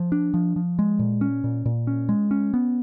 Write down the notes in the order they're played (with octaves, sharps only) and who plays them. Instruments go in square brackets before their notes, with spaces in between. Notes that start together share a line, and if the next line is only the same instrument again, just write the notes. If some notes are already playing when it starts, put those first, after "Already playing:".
Already playing: [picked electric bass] F3
D4
F3
F3
G#3
A#2
C#4
A#2
A#2
C#4
G#3
C#4
B3